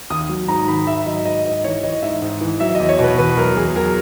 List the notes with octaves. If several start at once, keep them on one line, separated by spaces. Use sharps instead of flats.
D#2 D#6
F#3
G#2 A#5
D#3 B5
G#2 E5
F#3 D#5
G#2 D#5
G#2 D#5
E3 C#5
E3 D#5
G#2 E5
G#2
E3
F#3 E5
E2 D#5
C#5
B2 B4
E2 B4
F#3 A#4
E2 G#4
F#3 A#4